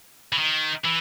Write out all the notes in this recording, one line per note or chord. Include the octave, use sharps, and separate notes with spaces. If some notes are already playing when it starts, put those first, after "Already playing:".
E3
D#3
E3